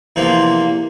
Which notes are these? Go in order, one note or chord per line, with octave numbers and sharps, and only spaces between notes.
E2 C3 F3 A#3